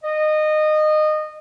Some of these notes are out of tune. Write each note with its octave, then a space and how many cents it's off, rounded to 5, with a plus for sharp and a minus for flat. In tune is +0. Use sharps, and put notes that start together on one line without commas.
D#5 -20